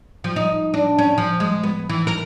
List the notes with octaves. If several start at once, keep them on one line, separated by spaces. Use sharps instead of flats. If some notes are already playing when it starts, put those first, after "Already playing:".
F3
D#4
D4
C#4
F3
G#3
B3
E3
A#4